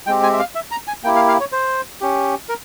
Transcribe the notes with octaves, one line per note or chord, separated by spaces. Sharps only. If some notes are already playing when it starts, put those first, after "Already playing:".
G#3 C4 G4 G5
G#5
E5
F5
E5
A#5
G#5
A#3 E4 G4 G5
F5
F5
C#5
C5
C#4 G4
A#4